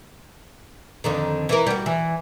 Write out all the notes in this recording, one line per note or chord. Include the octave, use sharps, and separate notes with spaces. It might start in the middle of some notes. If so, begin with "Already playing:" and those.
F2 D3 D#3
E3 A#4
G3 F#4
E3